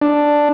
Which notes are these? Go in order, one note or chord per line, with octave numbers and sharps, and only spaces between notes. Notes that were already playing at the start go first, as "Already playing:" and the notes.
D4